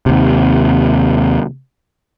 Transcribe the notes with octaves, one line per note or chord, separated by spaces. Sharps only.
D#2 C3